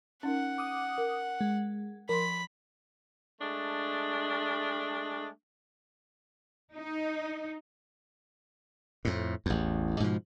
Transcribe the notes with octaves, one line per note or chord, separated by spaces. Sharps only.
C#4 D#4 A#4 F#5
D6 D#6
A#4
G#3
F3 A#4 B5 C6
G#3 A3 D4
D#4
F2 A2
A1 E2
G#2 B2 F3